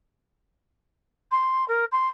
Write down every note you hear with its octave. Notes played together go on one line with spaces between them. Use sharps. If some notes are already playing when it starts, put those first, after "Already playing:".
C6
A#4
C6